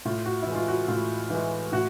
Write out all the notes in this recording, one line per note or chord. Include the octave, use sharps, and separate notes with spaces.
A2 F4
F#4
E3 E4
G#3 F4
F#4
A2 F4
E3 G#3
A2 F#4